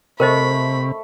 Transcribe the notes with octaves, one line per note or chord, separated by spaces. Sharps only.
C3 A3 A#4 C5 D#5 E5 B5 C#6